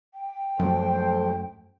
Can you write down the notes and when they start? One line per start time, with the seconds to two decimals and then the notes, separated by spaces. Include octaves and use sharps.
0.14 G5
0.59 F#2 F3 F#3 A3 A4 C5